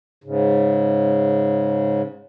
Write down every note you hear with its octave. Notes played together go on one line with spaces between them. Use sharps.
G#2 C#3